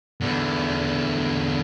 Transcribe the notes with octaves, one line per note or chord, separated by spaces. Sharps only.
E2 D3